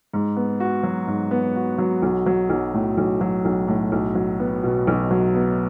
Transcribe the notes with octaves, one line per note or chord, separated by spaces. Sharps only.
G#2
B3
F#4
F#3
G#2
B3
F#4
F#3
B1
F#3
B1
A2
B1
F#3
B1
A2
B1
F#3
B3
B2
B1
F#3
B3